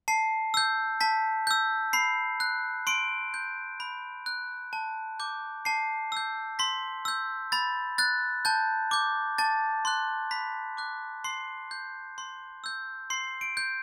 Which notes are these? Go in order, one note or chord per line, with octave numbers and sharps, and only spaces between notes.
A5 C7
E6 G6
A5 B6
E6 G6
B5 C7
F#6
C6 D7
G6
B5
F#6
A5
D6 G6
A5 C7
E6 G6
C6 B6
E6 G6
B5 A6
F#6 A6
A5 G6
D6 G6
A5 A6
C6 F#6
B5 B6
D6 F#6
C6 C7
G6
C6
E6 G6
C6 C7
D7
G6